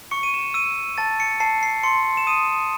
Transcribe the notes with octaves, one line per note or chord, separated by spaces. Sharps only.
C#6 C#7
D#7
E7
E6 D#7
A5 A6
C#7
A5 C7
C7
C6 C#7
E7
D#6 D#7